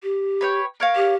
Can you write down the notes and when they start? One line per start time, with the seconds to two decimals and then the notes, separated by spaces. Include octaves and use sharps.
0.03 G4
0.41 B4 C#5 G5
0.80 A#4 C#5 F5
0.96 G4